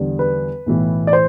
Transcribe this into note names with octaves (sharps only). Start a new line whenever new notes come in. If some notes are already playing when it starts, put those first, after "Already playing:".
Already playing: E2 D3 G3
B4
B1 A2 E3
D5
C5